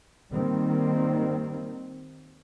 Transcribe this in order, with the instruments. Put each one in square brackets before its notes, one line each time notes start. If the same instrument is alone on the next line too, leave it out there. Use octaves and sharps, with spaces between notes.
[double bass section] D#3 G3 A#3 C4